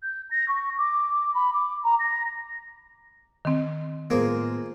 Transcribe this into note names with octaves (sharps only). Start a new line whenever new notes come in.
G6
A#6
C#6
D6
B5
D6
A#5
A#6
D#3 C4
A2 F3 G#3 A#3 B3